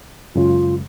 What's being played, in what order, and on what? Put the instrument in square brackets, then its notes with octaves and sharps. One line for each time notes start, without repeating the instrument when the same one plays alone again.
[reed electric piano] F#2 C#3 G#3 [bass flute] F4